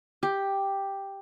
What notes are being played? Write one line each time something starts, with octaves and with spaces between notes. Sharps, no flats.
G4